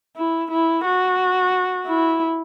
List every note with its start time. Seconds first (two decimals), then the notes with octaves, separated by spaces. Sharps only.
0.16 E4
0.51 E4
0.85 F#4
1.88 E4